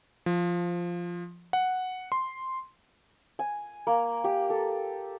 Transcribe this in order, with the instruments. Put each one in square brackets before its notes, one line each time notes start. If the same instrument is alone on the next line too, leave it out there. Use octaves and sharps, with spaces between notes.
[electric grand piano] F3
F#5
C6
[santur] G#5
A#3
G4
A4